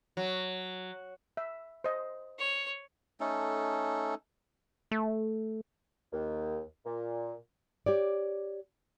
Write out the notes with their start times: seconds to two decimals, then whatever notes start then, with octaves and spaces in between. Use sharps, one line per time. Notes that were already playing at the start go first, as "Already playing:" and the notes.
0.17 F#3
1.37 E5
1.84 C5 D#5
2.39 C#5
3.20 A3 C#4 D#4 A4
4.91 A3
6.12 D#2
6.85 A#2
7.86 G4 C#5 D5